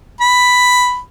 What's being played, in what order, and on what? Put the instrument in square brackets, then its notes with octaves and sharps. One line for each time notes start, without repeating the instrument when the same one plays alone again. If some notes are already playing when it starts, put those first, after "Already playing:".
[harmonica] B5